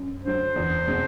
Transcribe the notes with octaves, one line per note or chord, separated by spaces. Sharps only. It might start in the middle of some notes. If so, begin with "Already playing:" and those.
Already playing: F#2
D3 F#3 C5
E2
B2 G#3 C4